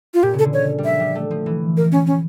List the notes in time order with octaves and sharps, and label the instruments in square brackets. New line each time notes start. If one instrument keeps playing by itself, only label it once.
[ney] F4
[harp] A#2 [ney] G4
[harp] C#3
[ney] A4
[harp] D3
[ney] C#5
[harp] G3
[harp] F3 [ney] E5
[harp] G3
A3
F3
E3
[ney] A#4
C#4
C#4